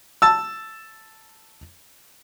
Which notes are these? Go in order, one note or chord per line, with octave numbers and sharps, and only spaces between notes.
A5 E6